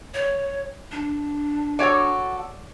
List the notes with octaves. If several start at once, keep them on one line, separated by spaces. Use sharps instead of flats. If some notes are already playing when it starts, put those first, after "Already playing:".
C#5
D4
F#4 A4 C#5 D5